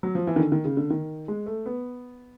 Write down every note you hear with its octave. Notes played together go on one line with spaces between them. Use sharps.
F#3
F3
E3
D#3
D3
D#3
C#3
D3
D#3
G#3
A3
B3